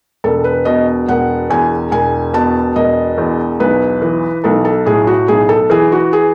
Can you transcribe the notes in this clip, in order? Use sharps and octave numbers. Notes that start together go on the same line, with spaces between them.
E1 A4
B4
B2 D#5
E1 F#5
E2 G#5
E1 G#5
B2 A5
E1 D#5
E2
B1 B4
E3
B1 A4
A4
A2 G#4
F#4
B1 G#4
A4
E3 G#4
F#4
G#4